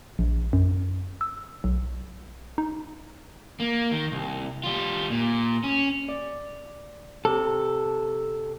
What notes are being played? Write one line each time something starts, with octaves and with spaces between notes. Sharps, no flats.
A#1
F#2
E6
B1
D#4
A#3
D#3
C2
G3 F4
A#2
C#4
D5
C3 A4